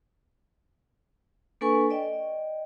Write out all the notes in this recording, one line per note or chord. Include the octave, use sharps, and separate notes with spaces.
A#3 D4 A4 B4 G#5 C#6
D5 D#5 G5